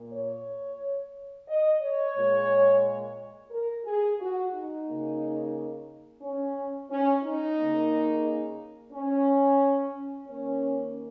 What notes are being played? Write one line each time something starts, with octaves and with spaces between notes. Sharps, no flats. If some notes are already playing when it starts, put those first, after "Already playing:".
Already playing: A#2 A#3
C#5
D#5
C#5
A#2 G#3
A#4
G#4
F#4
D#4
C#3 A#3
C#4
C#4
D#4
C#3 A#3
C#4
D#3 A#3 C#4